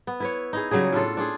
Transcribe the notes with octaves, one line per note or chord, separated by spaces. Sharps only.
B3
E4 B4 C#5
D#4 E4 G#4
C#3 F#3 G3 G#4
A2 D4 F4 A4
D4 F4 G#4